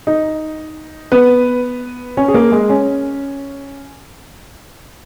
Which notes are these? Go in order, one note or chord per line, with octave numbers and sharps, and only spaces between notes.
D#4
B3 B4
C#4 C#5
G#4
A#3 A#4
G#3 G#4
C#4